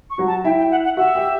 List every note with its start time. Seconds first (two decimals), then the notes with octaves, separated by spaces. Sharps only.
0.10 C#6
0.18 F#3 F#4
0.27 A5
0.44 E4 E5 G5
0.58 G5
0.71 F#5
0.84 F#5
0.97 F#4 E5 F#5
1.15 G4 G5